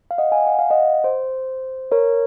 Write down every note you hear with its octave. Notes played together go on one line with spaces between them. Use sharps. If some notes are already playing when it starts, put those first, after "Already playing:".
F5
D#5 F#5
F5 G#5
F#5
F5
D#5 F#5
C5
A#4 C#5